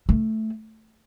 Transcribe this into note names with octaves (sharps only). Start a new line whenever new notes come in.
A3